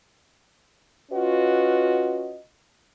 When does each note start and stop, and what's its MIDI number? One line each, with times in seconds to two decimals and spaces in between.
1.12 2.38 61
1.12 2.38 65
1.12 2.38 66
1.12 2.38 71
1.12 2.38 75